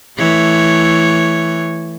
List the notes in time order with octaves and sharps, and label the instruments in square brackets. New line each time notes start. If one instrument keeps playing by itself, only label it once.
[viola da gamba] E3 A3 C#5